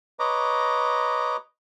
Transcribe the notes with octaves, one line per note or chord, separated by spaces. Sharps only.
B4 C#5 D#5 A#5 D6